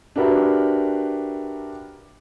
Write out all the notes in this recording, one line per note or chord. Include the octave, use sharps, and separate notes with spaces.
D4 F#4 G4 A#4 B4 E5